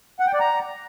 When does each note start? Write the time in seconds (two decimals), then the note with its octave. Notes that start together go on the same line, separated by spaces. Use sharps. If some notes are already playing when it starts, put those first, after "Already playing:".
0.20 F#5
0.26 G5
0.33 D5
0.40 A#5